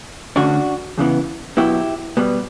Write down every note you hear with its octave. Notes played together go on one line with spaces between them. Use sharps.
D2 D3 A3 C#4 D4 F#4
E2 C#3 E3 B3
B2 F#3 B3 E4 G4
B2 G3 B3